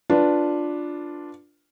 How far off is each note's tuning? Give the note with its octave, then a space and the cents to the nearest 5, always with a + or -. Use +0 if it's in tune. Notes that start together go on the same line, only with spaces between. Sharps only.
D4 +0 F4 +0 B4 +0